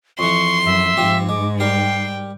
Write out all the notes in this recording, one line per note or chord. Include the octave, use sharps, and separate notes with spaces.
F2 E3 C6 C#6
F#2 E5
G#2 F3 C4 G4
G#3 D6
G3 G4 A#4 G5 C7